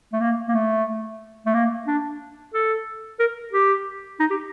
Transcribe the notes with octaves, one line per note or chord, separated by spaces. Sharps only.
A3
A#3
A#3
A3
A3
A#3
D4
A4
A#4
G4
D#4
G4